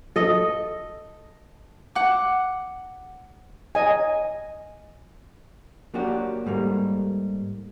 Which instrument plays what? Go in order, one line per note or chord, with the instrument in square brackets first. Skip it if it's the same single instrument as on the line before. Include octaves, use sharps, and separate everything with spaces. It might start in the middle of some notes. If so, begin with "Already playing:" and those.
[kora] A4 D#5
[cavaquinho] F#5 D6
[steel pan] D#5 G#5
[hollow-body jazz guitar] F#3 A#3 D4 F#4 G4
G#2 G3 A3 A#3